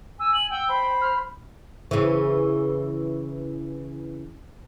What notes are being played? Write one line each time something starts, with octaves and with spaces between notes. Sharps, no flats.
G#5 E6
F#7
F#5 G5 E6
C5 B5
F6
C#3 E3